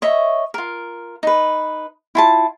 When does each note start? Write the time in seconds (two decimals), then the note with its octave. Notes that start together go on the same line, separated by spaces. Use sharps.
0.02 C#5 D#5 E5
0.54 F4 A#4
1.23 D#4 B4
2.15 E4 F4 A5